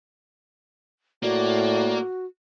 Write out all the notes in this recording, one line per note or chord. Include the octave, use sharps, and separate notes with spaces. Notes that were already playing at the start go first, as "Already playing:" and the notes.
A2 A#3 F#4 D5